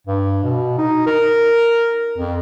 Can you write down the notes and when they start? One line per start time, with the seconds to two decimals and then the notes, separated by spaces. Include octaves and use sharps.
0.07 G2
0.43 B2
0.78 D#4
1.07 A#4
2.18 F2